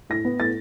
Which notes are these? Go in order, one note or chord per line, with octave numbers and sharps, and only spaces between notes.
A2 A#6
B3
A2 A6